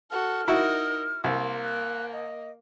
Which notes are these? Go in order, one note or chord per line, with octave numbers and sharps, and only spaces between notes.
F#4 A4 F6
D#4 E4 F#4 A#4
C2 A#3 C6
F#6
D#5